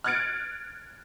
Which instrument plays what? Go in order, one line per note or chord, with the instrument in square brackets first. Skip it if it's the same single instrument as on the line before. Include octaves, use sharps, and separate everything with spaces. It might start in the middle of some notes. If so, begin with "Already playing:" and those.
[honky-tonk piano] F6 F#6 G#6 A6 C#7 D7